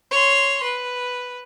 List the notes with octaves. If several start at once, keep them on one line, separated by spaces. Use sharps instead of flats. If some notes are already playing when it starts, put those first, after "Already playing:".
C#5 C6
B4